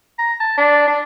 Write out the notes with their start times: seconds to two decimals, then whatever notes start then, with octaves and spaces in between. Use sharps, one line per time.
0.19 A#5
0.40 A5
0.58 D4
0.88 D4